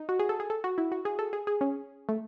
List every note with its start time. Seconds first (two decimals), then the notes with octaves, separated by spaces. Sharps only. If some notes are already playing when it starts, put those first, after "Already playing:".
Already playing: D#4
0.09 F#4
0.19 G#4
0.29 A4
0.40 G#4
0.50 A4
0.64 F#4
0.78 E4
0.92 F#4
1.05 G#4
1.19 A4
1.33 G#4
1.47 G#4
1.61 C#4
2.09 A3